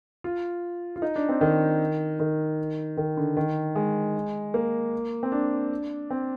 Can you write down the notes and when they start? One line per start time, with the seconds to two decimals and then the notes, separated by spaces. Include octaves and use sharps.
0.24 F4
0.96 F4
1.02 D#4
1.16 D4
1.29 C4
1.41 D#3
2.20 D#3
2.97 D#3
3.17 D3
3.37 D#3
3.76 G#3
4.54 A#3
5.23 C4
5.32 D4
6.11 C4